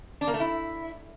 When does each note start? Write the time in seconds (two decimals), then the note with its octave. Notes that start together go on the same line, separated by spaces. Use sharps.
0.21 D4
0.27 A#3
0.34 A3
0.40 E4